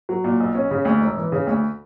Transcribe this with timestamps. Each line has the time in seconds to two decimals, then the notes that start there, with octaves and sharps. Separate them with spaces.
0.09 F#3
0.24 A#2
0.40 B1
0.55 C#4
0.71 C#3
0.85 D2
1.01 E1
1.17 E3
1.32 C#3
1.47 D2